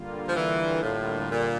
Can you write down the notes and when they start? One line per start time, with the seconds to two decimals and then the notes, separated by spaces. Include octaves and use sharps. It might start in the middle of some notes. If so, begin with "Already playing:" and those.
Already playing: D3 G3 A#3 F4
0.27 F3
0.36 E3
0.82 A2
1.30 A#2